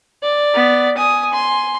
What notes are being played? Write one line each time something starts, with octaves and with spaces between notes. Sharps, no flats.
D5
B3
G#5 D#6
C6